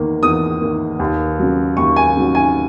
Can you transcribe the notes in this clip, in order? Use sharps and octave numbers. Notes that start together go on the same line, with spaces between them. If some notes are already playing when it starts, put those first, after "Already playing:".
Already playing: E2 D#3 A#3
E2 D#6
D#3 A#3
D#2
C#3 F#3
D#2 C#6
G#5
C#3 F#3
G#5